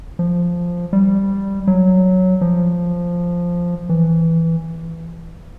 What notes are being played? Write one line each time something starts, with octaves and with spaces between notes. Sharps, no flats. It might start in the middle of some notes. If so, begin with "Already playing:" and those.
F3
G3
F#3
F3
E3